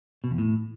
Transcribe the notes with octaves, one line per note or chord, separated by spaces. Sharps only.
B2
E2
A2